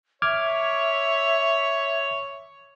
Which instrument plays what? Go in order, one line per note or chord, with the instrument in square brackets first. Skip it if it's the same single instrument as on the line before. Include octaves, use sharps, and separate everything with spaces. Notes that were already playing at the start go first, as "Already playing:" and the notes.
[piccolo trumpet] C#5 [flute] E5 [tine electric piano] D6 F6 G#6